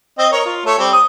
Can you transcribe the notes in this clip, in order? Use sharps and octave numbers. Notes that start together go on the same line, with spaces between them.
C4 D#5
A#4 C#5
F4
A3 A4 C#5
G3 C4
D#6